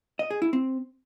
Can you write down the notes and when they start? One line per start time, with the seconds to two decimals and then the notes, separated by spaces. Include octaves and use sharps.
0.19 D#5
0.30 G#4
0.42 E4
0.53 C4